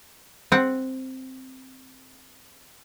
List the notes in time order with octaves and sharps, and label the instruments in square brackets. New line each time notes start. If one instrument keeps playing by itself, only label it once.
[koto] C4 F#5